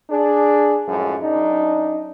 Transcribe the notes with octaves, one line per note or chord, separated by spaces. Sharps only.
D4 G#4
F#2 A2 F3 G#3
F#2 D4 D#4